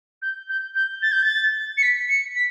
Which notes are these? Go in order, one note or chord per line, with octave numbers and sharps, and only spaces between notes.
G6
G6
G6
A6
G6
A6
C#7
B6
C#7
B6